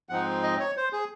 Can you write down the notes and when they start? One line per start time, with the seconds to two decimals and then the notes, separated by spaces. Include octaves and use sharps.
0.09 G#2 F3 C4 D#4 F#5
0.43 D#5
0.60 C#5
0.77 C5
0.93 G#4